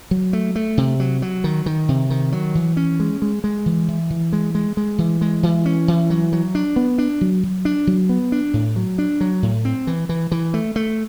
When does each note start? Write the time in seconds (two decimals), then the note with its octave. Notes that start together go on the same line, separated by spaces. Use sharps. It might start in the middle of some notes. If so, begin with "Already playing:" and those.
0.11 F#3
0.33 A3
0.56 A3
0.77 C3
1.00 F#3
1.22 F#3
1.44 D#3
1.66 D#3
1.89 C3
2.10 D#3
2.32 F#3
2.55 E3
2.77 C#4
3.00 G#3
3.22 G#3
3.44 G#3
3.66 E3
3.88 E3
4.10 E3
4.33 G#3
4.55 G#3
4.77 G#3
4.98 E3
5.21 G#3
5.43 E3
5.65 C#4
5.88 E3
6.10 F#3
6.33 F#3
6.55 D4
6.76 B3
6.98 D4
7.21 F#3
7.43 F#3
7.65 D4
7.87 F#3
8.09 B3
8.32 D4
8.53 A2
8.76 F#3
8.98 D4
9.21 F#3
9.43 A2
9.65 C4
9.87 E3
10.09 E3
10.32 E3
10.54 A3
10.76 A3